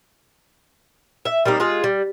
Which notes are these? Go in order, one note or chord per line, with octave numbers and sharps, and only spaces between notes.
E5
G3 A#3 C4 D#4
G#3 F4 G#4
G3